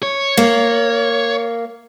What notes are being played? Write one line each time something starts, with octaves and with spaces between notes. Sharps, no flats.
C#5
A#3